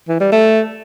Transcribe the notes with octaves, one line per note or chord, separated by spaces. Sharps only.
E3
G3
A3